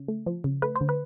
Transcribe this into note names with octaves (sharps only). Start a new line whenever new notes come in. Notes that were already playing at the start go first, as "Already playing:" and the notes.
Already playing: C#3
A3
F3
C#3
A3 B4
C5
D3
B4